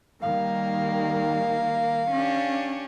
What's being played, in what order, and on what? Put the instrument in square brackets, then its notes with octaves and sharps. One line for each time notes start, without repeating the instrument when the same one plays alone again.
[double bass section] D#3 G3 [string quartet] A#3 [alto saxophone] F5
[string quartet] C#4 D4 G4